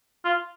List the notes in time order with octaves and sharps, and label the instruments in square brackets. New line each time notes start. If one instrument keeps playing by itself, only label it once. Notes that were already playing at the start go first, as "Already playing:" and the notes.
[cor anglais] F4